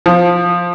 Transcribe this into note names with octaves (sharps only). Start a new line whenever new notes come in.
F3